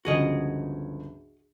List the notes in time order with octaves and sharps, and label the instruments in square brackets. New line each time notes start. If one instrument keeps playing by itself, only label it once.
[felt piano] G1 C#2 F3 [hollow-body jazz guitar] F#4 G#4 D#5